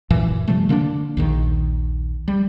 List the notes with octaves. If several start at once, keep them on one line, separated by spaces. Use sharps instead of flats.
F#2 A#2 E3
C3 F3 G3 A3
D3 A#3 B3 D4
A#1 D#2 D#3
G3